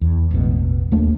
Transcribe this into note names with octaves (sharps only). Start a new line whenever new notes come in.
E2
E1 A1 B2
D#2 A3 A#3 D4